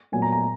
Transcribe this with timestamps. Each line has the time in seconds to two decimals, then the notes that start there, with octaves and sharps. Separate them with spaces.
0.12 A#2 F#3 B3 G#5
0.22 A#5
0.32 A#5